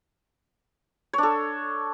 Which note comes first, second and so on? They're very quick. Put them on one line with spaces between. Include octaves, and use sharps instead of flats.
C#5 D4 A4